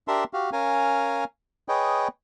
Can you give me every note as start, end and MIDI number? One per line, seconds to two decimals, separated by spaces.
0.08 0.24 62
0.08 0.24 67
0.08 0.24 70
0.08 0.24 76
0.08 0.24 81
0.08 0.24 84
0.33 0.50 66
0.33 0.50 67
0.33 0.50 77
0.53 1.24 61
0.53 1.24 70
0.53 1.24 77
0.53 1.24 80
1.68 2.08 68
1.68 2.08 71
1.68 2.08 73
1.68 2.08 75
1.68 2.08 79